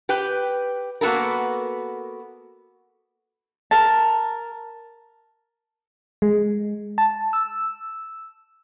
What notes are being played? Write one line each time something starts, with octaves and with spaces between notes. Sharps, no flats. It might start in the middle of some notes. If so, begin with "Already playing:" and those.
G4 B4 G5
A#3 B3 F#4 A4 A#4
A#4 A5
G#3
A5
E6